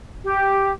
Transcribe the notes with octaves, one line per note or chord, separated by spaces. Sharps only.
G4